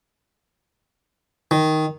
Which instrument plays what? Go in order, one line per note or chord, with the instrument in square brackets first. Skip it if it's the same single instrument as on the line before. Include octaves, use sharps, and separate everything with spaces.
[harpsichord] D#3